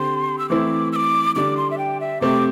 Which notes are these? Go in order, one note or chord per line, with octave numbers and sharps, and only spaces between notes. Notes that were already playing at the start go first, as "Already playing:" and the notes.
Already playing: D3 C4 G4 C6
E6
E3 A3 C4 E4 D6
E6
D6
D3 G3 D4 D6
C6
E5
G5
E5
C3 A3 C4 G4 D6